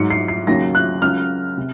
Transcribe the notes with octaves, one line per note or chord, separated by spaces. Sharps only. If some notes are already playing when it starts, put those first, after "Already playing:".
Already playing: G#2 F#3 C#7
C7
C7
D#2 C#3 F#3 A#6
F#6
C#2 C#3 F#3 F6
C3